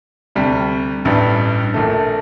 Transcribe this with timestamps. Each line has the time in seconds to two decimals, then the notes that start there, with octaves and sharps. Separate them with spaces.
0.36 D2 C3 G3
1.05 A1 G2 E3 G3
1.74 A#1 A#2 A3